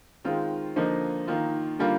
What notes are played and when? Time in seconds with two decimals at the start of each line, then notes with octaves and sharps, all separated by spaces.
0.25 D#3 G#3 C4 F4
0.76 D3 F3 A#3 D#4
1.27 D#3 A#3 F4
1.79 D3 G3 A#3 F4